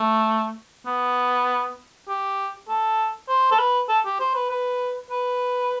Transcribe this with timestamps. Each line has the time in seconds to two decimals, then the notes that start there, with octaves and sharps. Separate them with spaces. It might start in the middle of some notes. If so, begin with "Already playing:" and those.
Already playing: A3
0.86 B3
2.08 G4
2.68 A4
3.29 C5
3.51 A4
3.59 B4
3.89 A4
4.05 G4
4.20 C5
4.35 B4
4.50 B4
5.10 B4